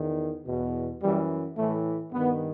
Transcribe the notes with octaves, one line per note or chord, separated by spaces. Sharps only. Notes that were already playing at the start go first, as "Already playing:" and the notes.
Already playing: E2 D#3
E2 B2
F#2 E3 G3
A2 E3 A3
G2 D#3 B3